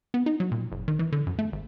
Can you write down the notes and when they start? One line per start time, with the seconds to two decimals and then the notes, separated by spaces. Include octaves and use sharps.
0.14 B3
0.26 D#4
0.40 F#3
0.52 A#2
0.72 F#1
0.88 D#3
0.99 E3
1.12 D3
1.27 F#2
1.39 A3
1.52 G#1